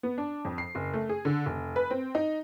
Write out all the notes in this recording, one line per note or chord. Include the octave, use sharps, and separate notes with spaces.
B3
D4
F2
C7
F#1
A3
G#4
D3
F1
B4
C4
D#4